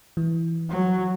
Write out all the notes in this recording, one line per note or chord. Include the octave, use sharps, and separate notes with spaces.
E3
F#3